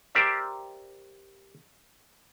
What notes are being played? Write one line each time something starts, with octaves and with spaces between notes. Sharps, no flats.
G4 A#4 C5 D5 E5